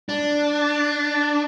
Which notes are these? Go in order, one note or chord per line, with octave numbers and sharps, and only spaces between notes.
D4